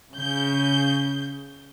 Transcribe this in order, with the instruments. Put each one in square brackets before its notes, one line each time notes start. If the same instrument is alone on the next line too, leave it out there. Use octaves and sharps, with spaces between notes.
[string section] C#3 G6